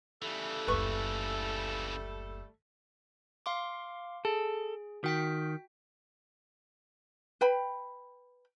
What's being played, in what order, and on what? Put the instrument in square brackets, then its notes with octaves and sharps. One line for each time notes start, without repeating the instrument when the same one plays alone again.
[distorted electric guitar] C#3 E3 [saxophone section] G3 A3 A4
[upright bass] F#1 D2 [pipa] B4 C#6
[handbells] F5 C6 D6
[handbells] G#4 [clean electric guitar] A4
[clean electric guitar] D#3 [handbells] F#4 G5 B6
[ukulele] B4 G5 B5